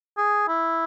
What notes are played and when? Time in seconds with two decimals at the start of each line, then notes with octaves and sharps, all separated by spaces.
0.18 G#4
0.48 E4